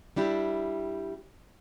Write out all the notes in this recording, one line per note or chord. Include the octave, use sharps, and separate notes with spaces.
G3 D4 E4 G4